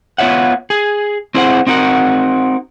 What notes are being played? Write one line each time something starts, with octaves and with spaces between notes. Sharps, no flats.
B3 F4 C#5 E5 F#5
G#4
C4 E4 G#4 C5 F5 F#5
C4 D#4 F#4 A#4 F#5